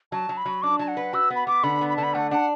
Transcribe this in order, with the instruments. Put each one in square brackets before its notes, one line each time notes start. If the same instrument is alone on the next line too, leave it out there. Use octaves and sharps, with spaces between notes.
[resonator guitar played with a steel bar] F#3 [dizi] A5
[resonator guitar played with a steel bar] F#3
[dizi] B5
[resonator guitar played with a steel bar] F#3
[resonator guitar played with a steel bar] D4 [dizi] D6
[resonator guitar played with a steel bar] F#3 [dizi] A5
[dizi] F#5
[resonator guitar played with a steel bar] B4
[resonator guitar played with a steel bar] F#4 [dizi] E6
[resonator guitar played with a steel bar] B3
[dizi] B5
[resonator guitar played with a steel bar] B3 [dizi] D6
[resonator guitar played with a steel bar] D3 [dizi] B5
[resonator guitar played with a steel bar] B3
[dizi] B5
[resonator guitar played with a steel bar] D3 [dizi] A5
[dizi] B5
[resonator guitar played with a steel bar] A3 [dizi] F#5
[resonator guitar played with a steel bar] D4 [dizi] F#5